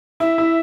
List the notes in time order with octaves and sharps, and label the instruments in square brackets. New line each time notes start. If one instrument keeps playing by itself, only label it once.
[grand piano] E4 [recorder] E5
[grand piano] E4